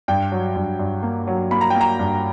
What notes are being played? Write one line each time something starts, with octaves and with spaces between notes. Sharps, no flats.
G2 G5
F#3
G2
G2
A#3
F#3
A#3 B5
A#5
G5
A#3
A#5
G2